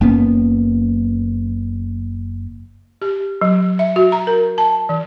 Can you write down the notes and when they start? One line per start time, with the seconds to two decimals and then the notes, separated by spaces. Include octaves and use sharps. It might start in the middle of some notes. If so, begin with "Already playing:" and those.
0.01 F#1 A#3 B3 C#4
3.02 G4
3.41 F#3
3.79 E5
3.96 F#4
4.12 A#5
4.27 A#4
4.58 A5
4.89 E3